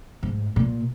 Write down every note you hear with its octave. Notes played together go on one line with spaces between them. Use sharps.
G#2
A#2